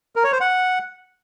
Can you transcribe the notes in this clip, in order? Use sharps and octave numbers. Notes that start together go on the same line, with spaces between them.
A#4
C#5
C5
F#5